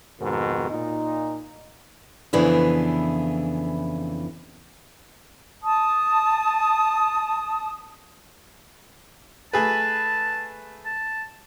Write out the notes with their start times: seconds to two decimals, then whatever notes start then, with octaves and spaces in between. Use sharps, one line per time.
0.21 F2 G#2 B2 D#3
0.70 A#2 D#4
2.33 F2 C#3 E3 B3 D4 E4
5.63 A5 D#6
9.53 A3 G#4 B4 A5
10.86 A5